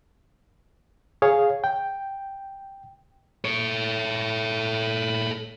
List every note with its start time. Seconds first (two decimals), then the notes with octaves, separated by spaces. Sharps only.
1.22 G#4 C#5 F5
1.64 G5
3.45 A4 C#5